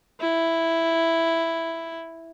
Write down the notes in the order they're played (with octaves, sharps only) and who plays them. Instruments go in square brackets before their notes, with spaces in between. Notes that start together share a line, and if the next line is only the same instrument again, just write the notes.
[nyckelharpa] E4